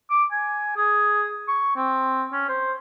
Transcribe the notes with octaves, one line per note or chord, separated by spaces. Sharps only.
D6
G#5
G#4
C#6
C4
C#4
C5